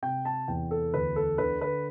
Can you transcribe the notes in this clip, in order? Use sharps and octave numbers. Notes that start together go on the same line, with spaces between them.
C3 G5
A5
E2 G5
A4
D2 B4
A4
D3 B4
B4